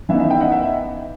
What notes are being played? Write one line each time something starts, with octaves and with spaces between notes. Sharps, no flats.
E3 B3 D#4 E5
E5
E5 G5
D#5 F#5
E5